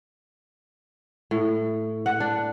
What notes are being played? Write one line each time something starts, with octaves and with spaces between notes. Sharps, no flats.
A2
F#5
D4